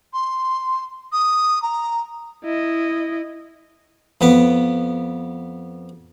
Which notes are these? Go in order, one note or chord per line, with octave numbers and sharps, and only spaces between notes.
C6
D#6
A#5
E4 D#5
F2 B3 B4 D6